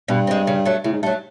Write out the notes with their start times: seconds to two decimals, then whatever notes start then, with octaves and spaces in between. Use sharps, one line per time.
0.08 G2 B2
0.27 G#3 C4
0.47 C#3
0.66 F#3 A3
0.84 A2 C#3
0.93 G#2
1.02 G2 F#3 A3